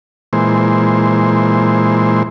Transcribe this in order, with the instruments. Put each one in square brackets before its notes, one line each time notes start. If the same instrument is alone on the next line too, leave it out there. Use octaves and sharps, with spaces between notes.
[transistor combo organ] A#2 E3 G#3 C5